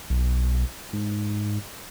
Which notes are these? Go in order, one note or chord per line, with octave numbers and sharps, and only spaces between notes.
B1
G#2